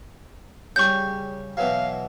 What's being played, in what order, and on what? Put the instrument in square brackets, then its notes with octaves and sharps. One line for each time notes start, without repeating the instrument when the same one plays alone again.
[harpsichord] C#3 G3 [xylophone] C#6 G6
[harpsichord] B2 E3 F#3 [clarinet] F5